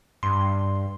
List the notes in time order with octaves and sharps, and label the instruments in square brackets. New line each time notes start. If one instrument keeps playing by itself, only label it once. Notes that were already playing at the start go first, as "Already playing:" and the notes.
[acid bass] G2 [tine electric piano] C6